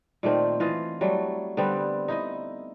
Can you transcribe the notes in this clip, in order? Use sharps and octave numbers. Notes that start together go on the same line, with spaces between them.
A#2 D#3 A3 C4
E3 F4 D#5
F#3 G3 A3
D3 G3 B3 C4
D#4 E4 D#5